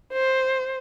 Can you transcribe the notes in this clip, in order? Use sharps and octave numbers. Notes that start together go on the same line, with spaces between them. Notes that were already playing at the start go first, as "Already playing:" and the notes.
C5